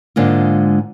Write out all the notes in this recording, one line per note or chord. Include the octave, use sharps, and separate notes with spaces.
G#2 D3 G#3 A#3 F4